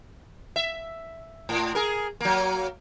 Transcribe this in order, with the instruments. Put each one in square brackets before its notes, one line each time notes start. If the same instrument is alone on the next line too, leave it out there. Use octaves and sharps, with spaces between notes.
[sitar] E5
A2
G#4 A#4
F#3 A#3